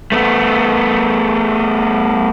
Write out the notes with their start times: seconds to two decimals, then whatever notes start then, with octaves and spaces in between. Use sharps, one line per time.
0.12 A3 B3